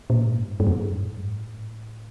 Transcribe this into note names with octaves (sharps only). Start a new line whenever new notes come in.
A#2
G#2
G2
G2
F#2
G#2
A2
G#2
A2